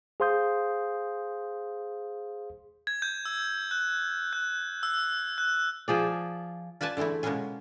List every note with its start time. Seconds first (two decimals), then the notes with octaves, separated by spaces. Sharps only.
0.20 G#4 C5 F5 C6 D#6 G6
2.87 G#6
3.02 G6
3.25 E6
3.71 F#6
4.33 F#6
4.83 E6
5.38 F#6
5.88 F3 G#4 D5
6.81 F4 B4 D5 G#5 A5
6.97 D3 E3 G#3 A3 E4
7.23 B2 G#3 A#3 B3 C#4 G#4